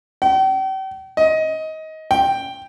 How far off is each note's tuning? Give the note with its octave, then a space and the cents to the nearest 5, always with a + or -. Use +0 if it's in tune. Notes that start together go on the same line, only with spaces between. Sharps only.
G5 -40
D#5 +20
G5 +5